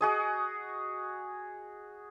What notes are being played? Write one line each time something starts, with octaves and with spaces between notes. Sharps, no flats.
F#4 G#4 D#5